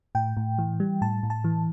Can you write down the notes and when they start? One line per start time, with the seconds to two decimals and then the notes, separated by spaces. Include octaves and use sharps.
0.15 A2 G5
0.37 A2
0.58 E3
0.80 G3
1.01 A2 A5
1.23 A2
1.30 A5
1.44 E3